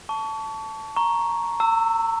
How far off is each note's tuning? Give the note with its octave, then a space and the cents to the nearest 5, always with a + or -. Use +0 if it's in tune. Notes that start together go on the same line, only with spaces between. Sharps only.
A5 +0 C#6 +30
A#5 +0 C#6 +0
A#5 -40 E6 +0